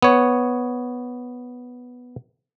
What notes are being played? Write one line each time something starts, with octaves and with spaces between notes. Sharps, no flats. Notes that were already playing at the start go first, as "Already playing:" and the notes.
B3 C#5